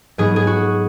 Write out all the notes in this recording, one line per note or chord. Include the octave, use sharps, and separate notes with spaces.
G#2 F#3 B3 G#4
G#4
F#4